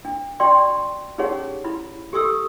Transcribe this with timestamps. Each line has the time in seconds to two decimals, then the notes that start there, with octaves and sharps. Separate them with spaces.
0.05 D4
0.40 D4 F#4 D5 G5 C6 C#6
1.18 C#4 D#4 G4 G#4 C#5 F#5
1.64 E4 B5
2.13 G4 A4 C#6 D#6 E6